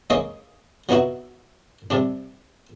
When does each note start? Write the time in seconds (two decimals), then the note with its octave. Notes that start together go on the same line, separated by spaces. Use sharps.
0.10 G#3 A#3 D#4 C#5 D#5
0.89 F#3 B3 D#4 E4 F#4
1.90 C3 G3 D4